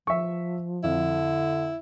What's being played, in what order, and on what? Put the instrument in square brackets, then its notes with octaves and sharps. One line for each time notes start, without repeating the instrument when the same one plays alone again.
[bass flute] F3 [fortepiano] E5 C#6
[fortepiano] F2 [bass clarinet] D3 [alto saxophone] E4